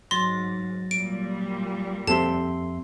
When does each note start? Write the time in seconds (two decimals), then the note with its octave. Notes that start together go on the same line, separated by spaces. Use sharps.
0.11 G#2 F#3 C6 A6 A#6
0.91 A#2 G3 D7
2.07 F2 C4 G4 A4 E5 A5 C6